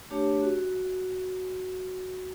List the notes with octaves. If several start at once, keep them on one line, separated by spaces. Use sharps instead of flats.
A3 D4 G4 C#5
F#4